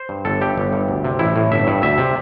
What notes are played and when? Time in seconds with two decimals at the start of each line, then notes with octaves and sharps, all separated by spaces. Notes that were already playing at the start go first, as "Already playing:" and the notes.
Already playing: C5
0.09 G2
0.25 G1 A4
0.41 G2 G4
0.57 G1
0.73 G2
0.88 D2
1.04 C3
1.19 A1 E4
1.36 A2
1.52 G1 E5
1.67 G2
1.82 D2 E5
1.98 C3